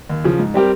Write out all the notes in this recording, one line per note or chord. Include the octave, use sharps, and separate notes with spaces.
D#2
C#3 F3
G#2
G3 C4 G4 A#4